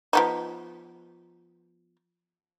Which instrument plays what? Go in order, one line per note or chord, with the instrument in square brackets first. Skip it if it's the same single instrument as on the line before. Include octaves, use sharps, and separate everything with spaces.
[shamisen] F3 B3 D#4